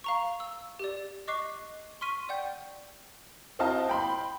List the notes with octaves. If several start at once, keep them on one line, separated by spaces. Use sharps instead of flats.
F5 A#5 C#6
E6
G4 D5
D#5 C#6 D6 F#6 C7
C6 C#6 F6 B6 D#7
D5 F#5 G5 G6
C4 E4 F#4 D#5 F5 A5
G5 B5 C6